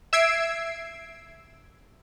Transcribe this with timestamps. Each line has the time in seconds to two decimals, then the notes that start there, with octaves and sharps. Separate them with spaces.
0.13 E5 E6 G#6 C7 D7